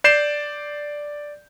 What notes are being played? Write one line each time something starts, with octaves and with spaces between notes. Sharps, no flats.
D5 G6 C7 E7